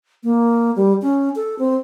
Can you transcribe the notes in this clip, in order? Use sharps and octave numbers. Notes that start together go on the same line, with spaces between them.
A#3
G3
C#4
A4
C4